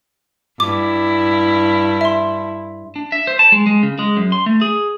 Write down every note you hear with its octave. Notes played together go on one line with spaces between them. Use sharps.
G2 E4 D6
E5 C6
D4
E5
C5
A5
G#3
G#3
C#3
G#3
F#2
C6
A3
G#4